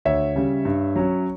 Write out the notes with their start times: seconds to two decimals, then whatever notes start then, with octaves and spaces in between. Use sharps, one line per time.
0.05 D2 C#5 E5
0.36 C#3 G3
0.65 G2
0.96 F#3 C#4